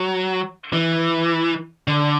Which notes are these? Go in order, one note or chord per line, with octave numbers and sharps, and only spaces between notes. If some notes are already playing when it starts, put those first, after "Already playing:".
Already playing: F#3
E3
D3